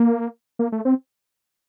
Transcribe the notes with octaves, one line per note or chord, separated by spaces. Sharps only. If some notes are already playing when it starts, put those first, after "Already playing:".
Already playing: A#3
A#3
A3
C4